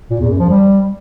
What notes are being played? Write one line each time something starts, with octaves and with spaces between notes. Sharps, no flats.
A#2
E2
F#2
F3
G3